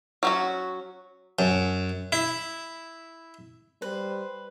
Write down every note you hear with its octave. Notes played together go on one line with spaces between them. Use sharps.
F#3 C#4 F#4
F#2
E4
G3 B4 C5